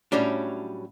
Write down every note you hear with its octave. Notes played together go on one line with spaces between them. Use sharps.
A2 F#3 G3 C#4 D4